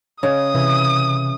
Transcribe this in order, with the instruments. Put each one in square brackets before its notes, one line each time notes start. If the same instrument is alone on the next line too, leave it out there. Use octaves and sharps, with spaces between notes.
[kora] C#3 D#5 [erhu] D#6
[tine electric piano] C3 [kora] E3